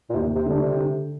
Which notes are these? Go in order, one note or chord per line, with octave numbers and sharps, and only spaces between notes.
A#2
D#2 C3
C3
D3 G3 D4
C3
D3